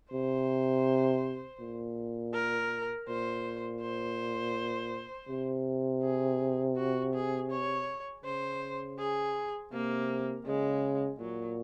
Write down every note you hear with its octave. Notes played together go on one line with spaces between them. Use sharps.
C3 C5
A#2
A#4
A#2 C5
C5
C3
G#4
F#4
G#4
C#5
C#3 C5
G#4
C3 A#3
C#3 G#3
A#2 F#3